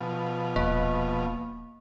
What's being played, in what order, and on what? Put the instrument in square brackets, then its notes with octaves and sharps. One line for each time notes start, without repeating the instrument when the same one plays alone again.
[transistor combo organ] B2 F3
[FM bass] D#1 [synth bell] A#3